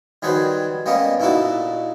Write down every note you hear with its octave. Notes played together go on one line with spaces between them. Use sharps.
D#3 F#3 G3 G#4 B4 C5
G3 A#3 B3 C#4 D#5
A#2 D#4 E4 F#4 A4